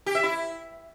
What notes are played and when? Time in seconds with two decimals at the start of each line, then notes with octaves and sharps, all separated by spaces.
0.06 G4
0.15 E5
0.23 E4